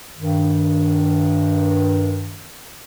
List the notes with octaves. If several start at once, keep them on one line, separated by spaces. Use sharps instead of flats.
G2 D#3